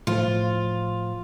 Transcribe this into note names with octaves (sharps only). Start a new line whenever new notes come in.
A2 F3 F4 C5